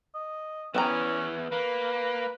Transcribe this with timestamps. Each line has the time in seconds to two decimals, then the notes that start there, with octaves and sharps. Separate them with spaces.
0.15 D#5
0.75 E2 E3 B3 C#4 G#5 A#5
1.52 A#3 B4